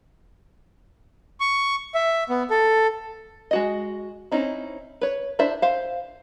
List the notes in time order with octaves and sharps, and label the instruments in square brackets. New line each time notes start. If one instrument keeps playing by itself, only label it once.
[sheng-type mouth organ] C#6
E5
B3
A4
[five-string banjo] G#3 F#4 D#5
C4 C#4 D#4 E4
B4 C#5
D4 E4 C5 E5
C5 E5 F5